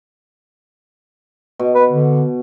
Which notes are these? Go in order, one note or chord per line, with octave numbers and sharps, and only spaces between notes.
B2
B4
D3